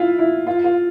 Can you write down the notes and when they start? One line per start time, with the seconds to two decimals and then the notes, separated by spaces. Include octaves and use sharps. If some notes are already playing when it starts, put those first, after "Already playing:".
Already playing: E4 F4
0.19 E4
0.47 F4
0.64 F4